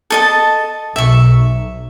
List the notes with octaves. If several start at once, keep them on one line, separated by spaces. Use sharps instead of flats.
A4 D#5 A5
B1 E5 C#6